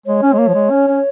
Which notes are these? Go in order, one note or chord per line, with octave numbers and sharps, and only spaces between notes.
G#3 C#5
C#4
G#3
A#3
F3
G#3
C#4
C#4